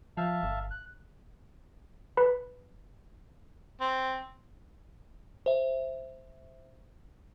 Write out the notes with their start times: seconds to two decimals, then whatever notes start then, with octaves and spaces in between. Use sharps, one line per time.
0.17 F3 E5 F5 A5
0.43 G1
0.71 F#6
2.17 B4 B5
3.81 C4
5.46 C5 E5